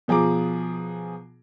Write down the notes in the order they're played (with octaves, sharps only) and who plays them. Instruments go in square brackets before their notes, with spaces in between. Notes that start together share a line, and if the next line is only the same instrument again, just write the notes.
[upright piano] B2 F3 G#4 A#5 D6